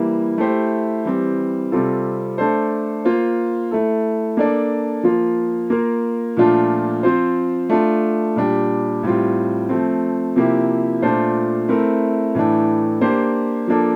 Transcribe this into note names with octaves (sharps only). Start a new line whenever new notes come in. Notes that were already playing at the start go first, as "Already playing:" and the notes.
Already playing: E3 G3 A#3 E4
A3 E4 G4 C5
E3 G3 C4
C3 G3 C4 F4 A4
A3 D4 A4 C5
A#3 F4 C5
A3 E4 A4
A#3 D4 A4 D5
F3 A#3 F4
A#3 F4 A#4
A#2 F3 A3 D4 F4
F3 C4 F4 C5
A3 D4 F4
A#2 G3 D4 G4
A2 G3 C4 F4
F3 A3 C4
C3 F3 A#3 E4 G4
A#2 A3 D4 F4 C5
A3 C4 E4 A#4
A2 E3 A3 D4
A#3 D4 G4 C5
F3 A#3 D4 A4